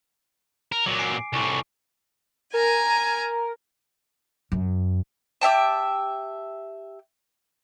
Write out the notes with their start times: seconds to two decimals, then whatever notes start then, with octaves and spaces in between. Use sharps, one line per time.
0.72 A#4
0.86 A#2 F#3 D6
0.99 G#5 C7 D7
1.33 C2 A2 G#5 C#6 D6
2.53 A#4 G#5 A#5
4.52 F#2
5.41 G4 E5 G5 A5